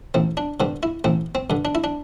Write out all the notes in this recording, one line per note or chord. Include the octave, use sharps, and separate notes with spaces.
A1 C4
D4
G2 D3 C4
E4
A1 C4
C4
G2 D3
D4
E4
D4